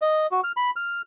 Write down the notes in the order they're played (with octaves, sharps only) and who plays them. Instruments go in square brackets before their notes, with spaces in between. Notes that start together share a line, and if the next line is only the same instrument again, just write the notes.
[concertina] D#5
F#4
F6
B5
F6